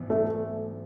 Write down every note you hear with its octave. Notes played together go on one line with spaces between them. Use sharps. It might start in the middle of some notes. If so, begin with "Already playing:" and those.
Already playing: G#2 E3 B3
A3